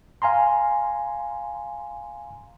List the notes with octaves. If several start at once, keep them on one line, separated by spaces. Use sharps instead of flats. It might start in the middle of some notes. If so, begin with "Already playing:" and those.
F5 G#5 A#5 C6